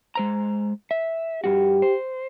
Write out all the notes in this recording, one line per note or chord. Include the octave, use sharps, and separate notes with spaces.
G#3 C5 A#5
E5
G2 F#4 G4
C5